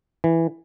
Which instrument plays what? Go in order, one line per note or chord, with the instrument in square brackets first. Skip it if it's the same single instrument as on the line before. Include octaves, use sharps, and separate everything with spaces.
[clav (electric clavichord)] E3